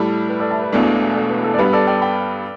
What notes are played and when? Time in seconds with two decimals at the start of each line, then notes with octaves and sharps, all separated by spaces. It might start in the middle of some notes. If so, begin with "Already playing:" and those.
Already playing: A2 G3 E4 A4 D5
0.29 B4
0.40 A4 D5
0.51 E5 A5
0.62 B4 E5
0.72 E1 E2 B2 A3 D4
1.15 A4 D5
1.30 B4
1.44 A4
1.54 D5
1.58 G2 G3 B3 B4
1.73 A4 D5
1.87 D5 G5
2.02 G5 B5